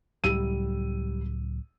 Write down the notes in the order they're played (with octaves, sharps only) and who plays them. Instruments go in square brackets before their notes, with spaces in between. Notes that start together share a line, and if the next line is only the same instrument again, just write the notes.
[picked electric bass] C#2 A2 F#3 [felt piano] G3 E6 D#7